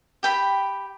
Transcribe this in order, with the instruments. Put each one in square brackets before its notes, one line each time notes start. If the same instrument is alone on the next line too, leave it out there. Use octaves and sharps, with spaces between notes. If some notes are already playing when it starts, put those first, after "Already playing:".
[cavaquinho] G4 G5 B5